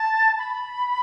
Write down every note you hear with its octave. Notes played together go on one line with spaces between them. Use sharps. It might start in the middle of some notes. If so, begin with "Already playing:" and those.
Already playing: A5
B5